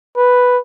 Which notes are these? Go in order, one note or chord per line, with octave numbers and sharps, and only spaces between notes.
B4